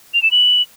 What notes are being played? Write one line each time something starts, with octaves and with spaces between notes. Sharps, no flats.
F7
E7
F#7